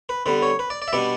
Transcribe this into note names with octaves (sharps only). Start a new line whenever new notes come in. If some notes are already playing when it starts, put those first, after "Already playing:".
B4
D3 G3 B3 B4
C#5
B4
D5
D5
E5
B2 G3 B3 D4 D5